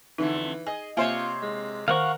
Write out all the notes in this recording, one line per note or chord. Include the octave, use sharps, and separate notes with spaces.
F2 D3 E3 A3 D#4
G#4 D#5 G#5
C3 A#3 F4 C5 C#5 E5 G#5
G#3
D#3 A#4 C5 F5 F#5 C#6